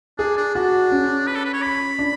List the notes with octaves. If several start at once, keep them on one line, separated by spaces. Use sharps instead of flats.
D4 G#4
D4
D4 F#4
C#4
B4
A4
B4
C#5
B5
D4